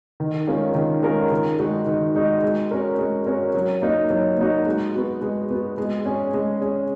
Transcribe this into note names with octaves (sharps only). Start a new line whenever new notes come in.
D#3
G#3 C#4 F4 A#4
D#3
G#3 C#4 F4 A#4
D#3
G#3 D#4 F#4
D#3
G#3 D#4 F#4
G#3
C#4 F#4 A#4
G#3
C#4 F#4 A#4
F#3
A#3 D#4 F#4
F#3
A#3 D#4 F#4
G#3
B3 F#4
G#3
B3 F#4
G#3
C#4 G#4
G#3
C#4 G#4